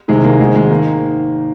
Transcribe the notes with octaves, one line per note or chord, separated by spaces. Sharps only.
C2 C3 D#3 G#3
A#3
G#1 G#2 D#3 G#3
G#3
D#3 A#3